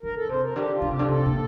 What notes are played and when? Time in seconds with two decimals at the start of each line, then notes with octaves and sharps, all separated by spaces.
0.03 D3 A#4
0.16 A4
0.29 C3 C5
0.43 A#4
0.56 D3 G4
0.73 F4
0.82 D3
0.90 C3 G4
0.99 D3
1.08 C3 A4
1.26 A#2